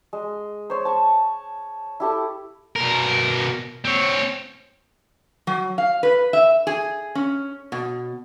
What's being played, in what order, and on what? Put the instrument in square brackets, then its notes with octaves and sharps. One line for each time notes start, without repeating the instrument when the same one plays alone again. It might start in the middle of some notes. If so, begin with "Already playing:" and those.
[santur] G#3
C5 C#5
A5 C#6
E4 G4 A4
[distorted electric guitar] B2 A#4
C4 C#5
[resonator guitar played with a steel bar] F#3
F5
B4
E5
G#4
C#4
B2